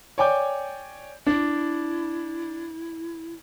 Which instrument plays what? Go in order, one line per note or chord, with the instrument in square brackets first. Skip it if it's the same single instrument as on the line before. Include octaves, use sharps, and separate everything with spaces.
[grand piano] C#5 D5 G5 G#5 D6 G6
[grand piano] D4 [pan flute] E4